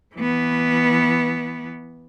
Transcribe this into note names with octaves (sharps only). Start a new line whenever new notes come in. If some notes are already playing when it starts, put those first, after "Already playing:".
E3 B3